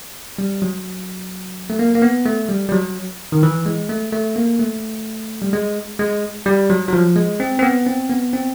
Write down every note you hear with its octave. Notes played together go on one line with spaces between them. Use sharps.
G3
F#3
A3
A#3
A#3
B3
A3
G3
G3
F#3
D#3
E3
G#3
A3
A3
A#3
A3
G3
G#3
G#3
G3
F#3
F#3
F3
G#3
C4
C4
B3
C4
B3
C4